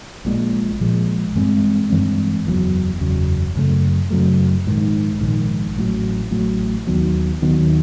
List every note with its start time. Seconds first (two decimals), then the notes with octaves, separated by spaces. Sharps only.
0.25 A#1 A#2 F3 G#3
0.79 A#1 A#2 F3 G#3
1.35 G2 E3 G#3 C4
1.90 G2 E3 G#3 C4
2.45 F#1 E2 C#3 F#3
3.01 F#1 E2 C#3 F#3
3.55 F#2 C#3 F#3 A3
4.10 F#2 C#3 F#3 A3
4.66 A#1 G#2 D#3
5.21 A#1 G#2 D#3
5.76 A1 A2 F#3
6.31 A1 A2 F#3
6.87 D#2 D#3 F#3 B3
7.42 D#2 D#3 F#3 B3